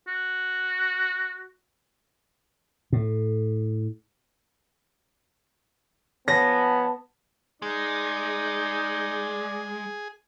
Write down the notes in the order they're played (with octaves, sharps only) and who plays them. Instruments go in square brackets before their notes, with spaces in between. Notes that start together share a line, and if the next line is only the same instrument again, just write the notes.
[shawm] F#4
[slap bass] A2
[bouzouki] F3 C#4 [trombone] B3 [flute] A5 [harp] A#6
[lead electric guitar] G#3 [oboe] D#4 [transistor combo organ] G#4 [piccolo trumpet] D5